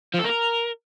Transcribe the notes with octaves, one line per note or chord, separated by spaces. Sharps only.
F3
A4
A#3
A#4